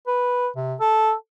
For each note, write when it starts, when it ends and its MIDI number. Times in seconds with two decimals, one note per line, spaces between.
0.07 0.49 71
0.56 0.75 48
0.80 1.13 69